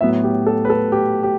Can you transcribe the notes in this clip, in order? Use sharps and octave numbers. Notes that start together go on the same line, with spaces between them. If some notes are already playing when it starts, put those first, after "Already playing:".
A2 F#3 B3 E5
G4
A4
B4
A4
G4
G4